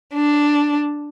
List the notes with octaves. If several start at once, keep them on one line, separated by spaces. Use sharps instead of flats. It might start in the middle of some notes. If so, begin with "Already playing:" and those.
D4